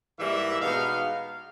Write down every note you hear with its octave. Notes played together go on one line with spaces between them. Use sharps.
G#2 E3 G3 A#3 E5
B2 G#3 B3 D#4 F5